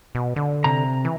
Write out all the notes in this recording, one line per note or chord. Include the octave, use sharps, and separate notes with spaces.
B2
D3
C3 A#5
E3